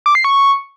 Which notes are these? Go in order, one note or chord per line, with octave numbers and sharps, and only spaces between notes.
D6
C7
C#6